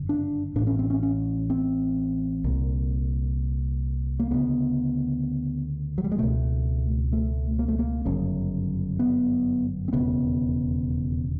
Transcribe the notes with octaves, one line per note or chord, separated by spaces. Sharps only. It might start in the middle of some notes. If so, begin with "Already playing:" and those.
Already playing: G1 F#2 C#3
D4
A1 A2 D4
C#4
C4
C#4
C#4
C4
C2 A#2
A#3
D2 C#3 B3
F#3
G3
G#3
C#2 B2 A3
A3
A#3
A3
A#3
G1 F#2 C#3
B3
C4
E1 D#2 C#3 B3